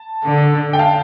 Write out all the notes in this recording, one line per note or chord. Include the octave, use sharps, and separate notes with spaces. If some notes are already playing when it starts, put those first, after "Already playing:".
Already playing: A5
D3
G5
F5 A5